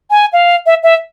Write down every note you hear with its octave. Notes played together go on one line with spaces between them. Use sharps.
G#5
F5
E5
E5